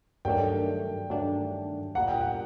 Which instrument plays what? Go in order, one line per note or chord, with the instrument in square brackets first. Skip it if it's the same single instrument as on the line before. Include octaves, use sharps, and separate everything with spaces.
[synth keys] G2 D#3 F#3 A3 D4 [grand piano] G5
[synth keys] G2 D#3 F#3 A3 D4
[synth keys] A#2 G3 A#3 [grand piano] F#5
[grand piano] G5
F#5